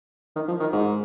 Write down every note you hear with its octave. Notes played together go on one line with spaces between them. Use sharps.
D#3
F3
D#3
G#2